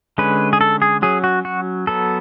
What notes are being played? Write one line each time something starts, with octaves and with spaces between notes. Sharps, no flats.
D3 G#3 C#4 B4
G#4
A4
G#4
F#3 C#4 G#4
F#4
F#4
F#3 B3 A4